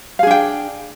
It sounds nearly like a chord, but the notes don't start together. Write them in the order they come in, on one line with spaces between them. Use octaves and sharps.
F5 G#4 D4 G5